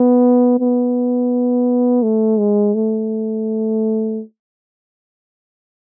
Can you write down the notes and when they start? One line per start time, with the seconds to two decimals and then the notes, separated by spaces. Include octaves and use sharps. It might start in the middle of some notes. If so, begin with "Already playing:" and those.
Already playing: B3
0.60 B3
2.03 A3
2.39 G#3
2.75 A3